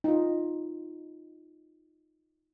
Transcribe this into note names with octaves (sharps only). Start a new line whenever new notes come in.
D#4 F4